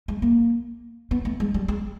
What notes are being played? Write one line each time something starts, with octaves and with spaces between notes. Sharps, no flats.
G#3
A#3
B3
A3
G#3
G3
G#3